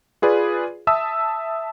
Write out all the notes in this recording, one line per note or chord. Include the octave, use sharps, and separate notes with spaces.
F4 G#4 B4 D5
E5 A5 D#6 E6